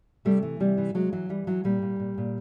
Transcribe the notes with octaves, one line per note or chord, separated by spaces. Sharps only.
C3 G3 A3
E3
C3 G3
E3
C3 F#3 G#3
E3 F#3
E3 G3
E3 F#3
A#2 G3
A#2
A#2
A#2